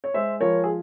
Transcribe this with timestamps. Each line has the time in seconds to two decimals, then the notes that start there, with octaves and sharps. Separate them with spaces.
0.04 C#5
0.14 G#3 C5 E5
0.40 F3 A#4 C#5
0.64 G#4